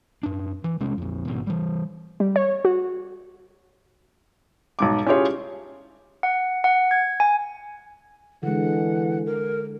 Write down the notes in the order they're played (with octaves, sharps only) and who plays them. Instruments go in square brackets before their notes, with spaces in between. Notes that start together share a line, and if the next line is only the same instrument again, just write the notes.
[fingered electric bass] F#2 D4
E3
E1 C3 G#3 C#4
A#1 F2
G#1 B2
E3 G3
[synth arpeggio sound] G3
C#5
F#4
[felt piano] B1 G#2 D6
C#4 E4 F4 G4 G#4 C#5
[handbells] F#5
F#5
G#6
G#5
[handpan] D3 G#3 [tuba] E3 [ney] F#5
[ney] A#4